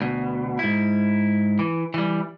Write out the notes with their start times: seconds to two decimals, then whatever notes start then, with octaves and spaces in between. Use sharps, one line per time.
0.01 D2 B2
0.59 G#2 E4
1.59 E3
1.94 E3 G3